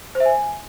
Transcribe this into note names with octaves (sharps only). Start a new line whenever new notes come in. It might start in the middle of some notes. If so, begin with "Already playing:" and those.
C5
E5
G#5